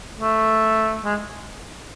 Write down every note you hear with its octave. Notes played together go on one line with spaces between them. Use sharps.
A3
G#3